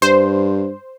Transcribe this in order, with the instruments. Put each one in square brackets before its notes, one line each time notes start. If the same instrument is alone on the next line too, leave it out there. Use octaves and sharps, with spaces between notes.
[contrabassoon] G2 [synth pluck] C5